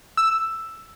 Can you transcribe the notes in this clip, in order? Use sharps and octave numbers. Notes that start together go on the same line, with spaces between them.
E6